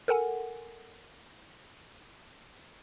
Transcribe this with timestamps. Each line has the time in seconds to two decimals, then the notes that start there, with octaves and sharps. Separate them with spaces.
0.08 A4 A#4 F#5 G#5